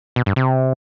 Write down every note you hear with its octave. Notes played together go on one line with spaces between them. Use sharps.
B2
G2
C3